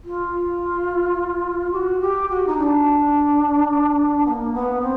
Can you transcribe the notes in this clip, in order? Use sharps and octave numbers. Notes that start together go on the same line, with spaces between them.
F4
G4
F#4
G4
F#4
D#4
D4
B3
A#3
B3
C4